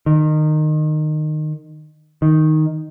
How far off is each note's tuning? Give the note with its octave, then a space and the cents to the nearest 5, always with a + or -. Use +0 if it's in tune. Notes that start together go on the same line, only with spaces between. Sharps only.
D#3 -20
D#3 +0